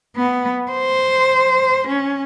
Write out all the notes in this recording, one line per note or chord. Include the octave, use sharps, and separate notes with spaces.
B3
C5
C#4